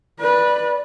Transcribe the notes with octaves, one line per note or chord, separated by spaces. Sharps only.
B4 D5